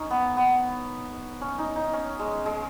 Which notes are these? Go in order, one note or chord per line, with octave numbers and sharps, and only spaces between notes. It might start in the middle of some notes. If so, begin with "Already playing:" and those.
Already playing: C#4 D#4
B3
B3
C#4
D#4
D#4
C#4
G#3
G#3